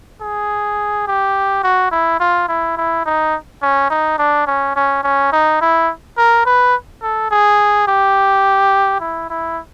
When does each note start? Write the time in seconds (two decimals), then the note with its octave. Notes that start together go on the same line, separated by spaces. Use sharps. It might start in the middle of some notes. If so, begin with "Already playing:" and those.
0.21 G#4
1.07 G4
1.63 F#4
1.91 E4
2.20 F4
2.49 E4
2.77 E4
3.06 D#4
3.62 C#4
3.90 D#4
4.18 D4
4.47 C#4
4.76 C#4
5.04 C#4
5.32 D#4
5.61 E4
6.17 A#4
6.46 B4
7.02 A4
7.31 G#4
7.88 G4
9.00 E4
9.30 E4